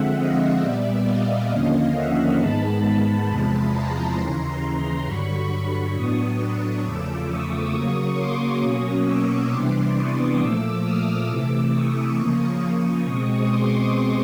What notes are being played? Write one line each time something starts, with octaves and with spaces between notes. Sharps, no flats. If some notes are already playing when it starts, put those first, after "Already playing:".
Already playing: D3 F3 G#3 C4 E5 F#5
D#5 F5
A#2 G3 B3 D5 E5
D#5 F5
D#2 D3 F3 A#3 C#4
E5 F#5
G#2 D#3 G#3 B3 A5 B5
A5 B5
E2 C3 F3 G#3
A#5 C6
D#2 C#3 E3
G2 D3 F#3 B5 C#6
A2 F#3 B3 D4 C#6 D#6
C#6 D#6
E2 C#3 F3 A3 D6 E6
C#6 D#6
C#3 F#3 A#3 C#6 D#6
C6 D6
B2 F#3 A#3 C#4 C#6 D#6
D6 E6
C3 E3 G3 B3 D4 C6 D6
C#6 D#6
A#2 F3 A3 D6 E6
D#6 F6
C3 E3 A3 D6 E6
C#6 D#6
C#3 F3 A#3 C#6 D#6
B2 G#3 C4
C6 D6